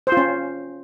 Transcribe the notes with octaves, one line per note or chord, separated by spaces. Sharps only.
C5
F4
C#4